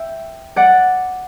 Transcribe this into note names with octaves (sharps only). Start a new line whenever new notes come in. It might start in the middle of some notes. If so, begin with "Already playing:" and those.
Already playing: E5 G5
D5 F#5